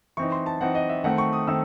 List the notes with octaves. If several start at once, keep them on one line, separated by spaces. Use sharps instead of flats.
E3 C4 D#4 C#6
C6
A5
E3 C4 D#4 F#5
D#5
E5
D#3 A3 C4 F#5
C#6
D#6
D#3 A3 C4 E6